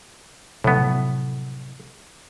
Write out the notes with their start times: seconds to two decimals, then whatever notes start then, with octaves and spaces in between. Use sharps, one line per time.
0.64 A2 C3 F3 F#3 B3